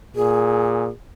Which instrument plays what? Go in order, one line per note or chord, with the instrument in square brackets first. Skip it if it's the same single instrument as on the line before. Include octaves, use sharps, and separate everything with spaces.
[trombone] A#2 [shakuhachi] G#4